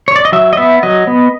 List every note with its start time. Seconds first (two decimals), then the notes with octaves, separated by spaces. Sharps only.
0.08 C#5
0.16 D5
0.25 D#5
0.32 F#3 E5
0.53 D#5
0.57 B3 E5
0.83 F#3 D#5
1.07 B3